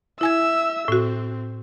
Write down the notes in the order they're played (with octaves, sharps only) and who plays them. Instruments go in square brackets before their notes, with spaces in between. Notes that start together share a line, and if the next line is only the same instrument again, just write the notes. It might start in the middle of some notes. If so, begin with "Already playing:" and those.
[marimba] E4 G#5 G#6 [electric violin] E5 E6
[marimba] A2 F#4 [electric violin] C4